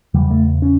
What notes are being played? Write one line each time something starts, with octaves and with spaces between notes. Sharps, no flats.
E2 C#3 G3
A3
C#4